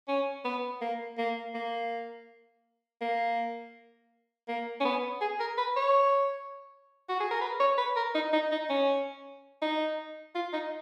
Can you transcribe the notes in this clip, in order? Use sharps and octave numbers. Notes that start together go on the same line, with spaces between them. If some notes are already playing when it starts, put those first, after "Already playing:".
C#4
B3
A#3
A#3
A#3
A#3
A#3
C#4
B3
G#4
A#4
B4
C#5
F#4
G#4
A#4
B4
C#5
B4
A#4
D#4
D#4
D#4
C#4
D#4
F4
D#4